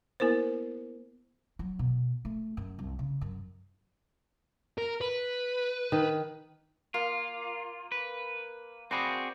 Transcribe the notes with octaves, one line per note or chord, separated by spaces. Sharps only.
A#3 B3 E4 A#4 C5
F#3
B2
A3
F#2
C2
C#3
F#2
A#4
B4
D#3
A#3 F4
B4
C4 F#4 G#4 D5 B5